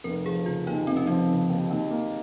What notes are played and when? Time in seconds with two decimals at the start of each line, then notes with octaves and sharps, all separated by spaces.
0.04 F1 A#4
0.26 F3 G#4
0.46 C#3 F4
0.67 D#2 D#4
0.87 F1 C4
0.97 C#4
1.07 F3 C4
1.28 C#3
1.49 D#2
1.70 D#2
1.91 A#3